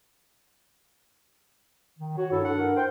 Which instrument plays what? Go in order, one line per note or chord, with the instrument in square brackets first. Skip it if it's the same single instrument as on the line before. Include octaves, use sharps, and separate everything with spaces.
[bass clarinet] D#3
[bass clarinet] F#4 [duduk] C#5
[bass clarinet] G2 [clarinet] E4 [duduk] A4
[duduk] A4 [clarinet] F#5
[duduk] A#4
[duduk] C5 [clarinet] G5